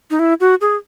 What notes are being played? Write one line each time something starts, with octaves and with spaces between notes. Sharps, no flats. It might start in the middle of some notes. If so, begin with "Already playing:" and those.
D#4
E4
F#4
G#4